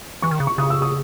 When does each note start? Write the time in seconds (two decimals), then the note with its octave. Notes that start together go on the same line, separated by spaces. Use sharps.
0.22 E3 C#6
0.31 D#3
0.40 C#3
0.47 C#6
0.58 C#3 D#6
0.70 E6
0.82 D#6